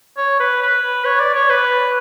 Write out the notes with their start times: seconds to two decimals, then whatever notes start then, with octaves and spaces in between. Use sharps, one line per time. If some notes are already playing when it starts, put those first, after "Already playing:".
0.18 C#5
0.40 B4
0.62 B4
1.05 C#5
1.20 D5
1.35 C#5
1.50 B4